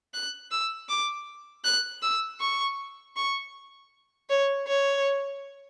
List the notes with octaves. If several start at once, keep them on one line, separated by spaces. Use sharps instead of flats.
F#6
E6
D6
F#6
E6
C#6
C#6
C#5
C#5